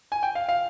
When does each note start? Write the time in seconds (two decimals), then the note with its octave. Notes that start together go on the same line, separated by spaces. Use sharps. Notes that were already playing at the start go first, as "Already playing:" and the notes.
0.12 G#5
0.23 G5
0.35 F5
0.49 F5